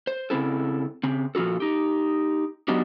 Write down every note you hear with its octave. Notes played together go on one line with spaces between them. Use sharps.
C5
C#3 F3 C4 E4 A4
C#3 C4
A#2 F3 F4 F#4 A4
D#4 G4
F#3 B3 D4 D#4 F#4 G4